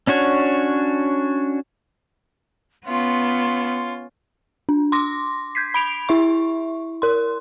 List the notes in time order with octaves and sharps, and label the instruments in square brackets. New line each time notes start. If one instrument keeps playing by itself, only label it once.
[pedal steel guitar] C#4 D4 F#4 C#5
[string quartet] B3 [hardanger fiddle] C#4 F4 [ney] C6
[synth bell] D4
C6 D6 A#6
G6 G#6 B6 C7
B5 D7 F7
E4 E5 C#6
A#4 C6